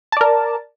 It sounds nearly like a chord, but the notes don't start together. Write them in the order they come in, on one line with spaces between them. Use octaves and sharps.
A5 D5 A#4